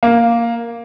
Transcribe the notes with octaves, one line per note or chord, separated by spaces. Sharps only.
A#3